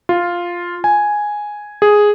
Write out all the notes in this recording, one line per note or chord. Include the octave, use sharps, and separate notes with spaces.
F4
G#5
G#4